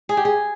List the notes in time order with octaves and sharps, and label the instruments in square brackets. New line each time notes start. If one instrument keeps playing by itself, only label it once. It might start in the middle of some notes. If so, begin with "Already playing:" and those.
[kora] G#4
G4
G#4